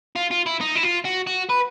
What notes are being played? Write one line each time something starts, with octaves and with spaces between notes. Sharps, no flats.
F4
F4
E4
D#4
E4
F4
F#4
F#4
B4